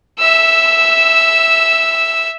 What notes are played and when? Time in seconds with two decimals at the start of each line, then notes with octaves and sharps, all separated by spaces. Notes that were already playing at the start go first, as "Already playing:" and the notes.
0.19 E5 E6